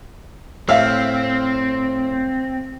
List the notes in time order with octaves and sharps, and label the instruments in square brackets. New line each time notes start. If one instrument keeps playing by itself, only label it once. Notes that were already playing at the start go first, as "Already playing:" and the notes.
[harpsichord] A2 [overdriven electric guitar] C4 [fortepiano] E5 F5 F6